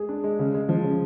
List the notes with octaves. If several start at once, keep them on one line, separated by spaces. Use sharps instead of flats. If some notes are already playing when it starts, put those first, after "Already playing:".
Already playing: G#3 G#4
D4
G#3
C#3
G#3
F3
C#3